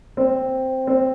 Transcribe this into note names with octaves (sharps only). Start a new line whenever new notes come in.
C4
C4